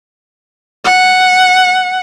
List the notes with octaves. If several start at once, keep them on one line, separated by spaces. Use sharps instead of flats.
F#5